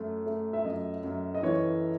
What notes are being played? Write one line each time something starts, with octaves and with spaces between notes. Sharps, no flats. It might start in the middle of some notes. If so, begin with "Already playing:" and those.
Already playing: F#2 A3
A3
E5
F#2 D#5
F#2
D#5
E3 C#5